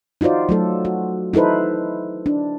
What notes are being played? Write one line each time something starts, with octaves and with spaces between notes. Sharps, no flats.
D#4 F4 F#4 C5 D5
F#3 A3 A4
F#4
D#4 E4 A4 B4 C5
D4